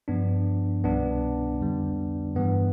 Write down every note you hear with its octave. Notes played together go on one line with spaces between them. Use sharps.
G2 F3 B3 D4
C2 B2 G3 B3 D4
F2 D3 G3
G2 E3 G3 B3